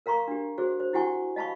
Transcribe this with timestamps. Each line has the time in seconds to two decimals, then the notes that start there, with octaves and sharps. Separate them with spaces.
0.06 A#4 F5 A#5 C6 C#6
0.28 D4 G4
0.58 F#4 G#4 C5
0.80 C5
0.93 E4 F#4 G4 F#5 G#5 C#6
1.36 D#5 F5 A5 B5 C#6